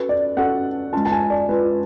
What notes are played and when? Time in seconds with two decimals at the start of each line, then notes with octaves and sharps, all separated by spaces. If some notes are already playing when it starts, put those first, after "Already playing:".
Already playing: C#4 F#4 A4 B4
0.09 D5
0.37 C#4 F#4 A4 F#5
0.93 G#3 C#4 F4 A5
1.05 A5
1.12 G#5
1.30 D5
1.49 G#3 C#4 F4 B4